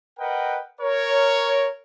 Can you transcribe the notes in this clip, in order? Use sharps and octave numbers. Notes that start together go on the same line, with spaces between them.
A#4 B4 D#5 F#5 G5
A#4 C#5